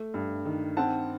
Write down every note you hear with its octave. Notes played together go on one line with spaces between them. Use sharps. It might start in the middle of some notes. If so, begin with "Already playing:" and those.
Already playing: A3
G2
D#3
C4 F#5 A5